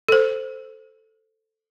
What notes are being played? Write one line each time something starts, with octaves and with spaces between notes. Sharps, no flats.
A4 C5